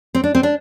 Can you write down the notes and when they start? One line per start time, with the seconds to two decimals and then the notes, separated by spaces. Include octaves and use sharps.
0.15 C4
0.24 D4
0.35 C4
0.43 D4